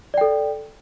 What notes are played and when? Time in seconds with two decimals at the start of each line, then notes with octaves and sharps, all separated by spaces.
0.14 D5
0.18 G5
0.21 A4